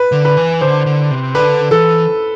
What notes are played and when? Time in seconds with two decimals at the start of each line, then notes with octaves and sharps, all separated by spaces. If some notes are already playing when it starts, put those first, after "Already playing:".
Already playing: B4
0.12 D3
0.25 B4
0.37 E3
0.61 D3 C5
0.86 D3
1.11 C3
1.35 D3 B4
1.71 E3 A4